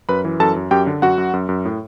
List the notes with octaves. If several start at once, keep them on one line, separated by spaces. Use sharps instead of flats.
F#2 B4 B5
E3
F#2 A4 A5
F#2
F#2 G4 G5
D3
F#2 F#4 F#5
F#2
F#2
F#2
A2